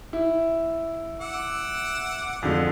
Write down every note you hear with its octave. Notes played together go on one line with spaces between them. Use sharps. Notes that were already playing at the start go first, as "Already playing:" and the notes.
E4
F#5 D6 E6
F2 D3 G#3